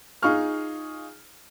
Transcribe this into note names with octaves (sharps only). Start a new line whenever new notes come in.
D#4 F4 G#4 C#6 F6